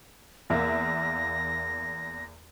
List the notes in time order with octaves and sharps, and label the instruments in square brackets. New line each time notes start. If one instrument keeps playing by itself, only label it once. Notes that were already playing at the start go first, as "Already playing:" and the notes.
[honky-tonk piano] E2 A#3 E5 [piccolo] A#6